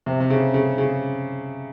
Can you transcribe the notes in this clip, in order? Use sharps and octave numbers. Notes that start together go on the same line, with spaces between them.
C3
C3
C#3
C#3
C#3